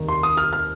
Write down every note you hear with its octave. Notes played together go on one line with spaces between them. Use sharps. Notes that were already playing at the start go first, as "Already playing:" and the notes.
Already playing: F1 D#2 D#3 G3
C6
D#6
F6
F6